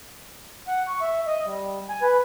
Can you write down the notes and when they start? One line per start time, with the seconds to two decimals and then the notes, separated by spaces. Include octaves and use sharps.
0.68 F#5
0.88 C#6
1.01 E5
1.27 D#5
1.45 G3
1.89 G#5
2.02 B4